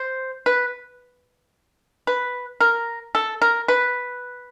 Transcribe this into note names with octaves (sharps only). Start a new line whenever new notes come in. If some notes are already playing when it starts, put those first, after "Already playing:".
Already playing: C5
B4
B4
A#4
A4
A#4
B4